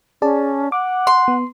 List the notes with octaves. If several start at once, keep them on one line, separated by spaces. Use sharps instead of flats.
C#4 G#4 D5 A5
F#5 D6
C6
B3